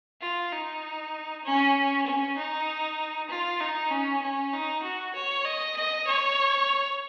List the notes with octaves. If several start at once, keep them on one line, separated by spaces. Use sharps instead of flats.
F4
D#4
C#4
C#4
D#4
F4
D#4
C#4
C#4
D#4
F#4
C#5
D#5
D#5
C#5